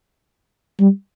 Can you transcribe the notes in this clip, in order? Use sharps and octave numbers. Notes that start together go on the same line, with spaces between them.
G3